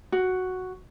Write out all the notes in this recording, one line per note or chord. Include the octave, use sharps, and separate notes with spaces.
F#4